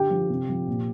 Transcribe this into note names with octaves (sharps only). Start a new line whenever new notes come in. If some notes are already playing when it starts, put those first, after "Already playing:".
Already playing: D3 G4 G5
F3
C3
F3
A#2